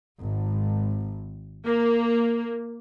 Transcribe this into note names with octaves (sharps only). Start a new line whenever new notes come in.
G#1
A#3